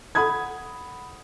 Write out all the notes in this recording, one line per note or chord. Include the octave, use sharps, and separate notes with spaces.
A4 F#5 B5 D#6 G#6